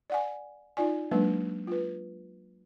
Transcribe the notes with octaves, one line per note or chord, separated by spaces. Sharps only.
D5 F#5 G#5
D#4 F4 D5 G#5
F#3 G#3 A#3 D4 B4
F4 B4